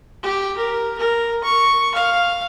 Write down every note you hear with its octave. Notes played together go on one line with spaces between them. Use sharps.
G4
A#4
A#4
C#6
F5